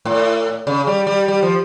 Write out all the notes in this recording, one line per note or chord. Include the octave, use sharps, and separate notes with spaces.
A2
C#3
G3
G3
G3
F3